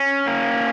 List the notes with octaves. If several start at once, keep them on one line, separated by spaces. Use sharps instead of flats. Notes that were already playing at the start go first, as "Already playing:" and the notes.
Already playing: C#4
A#3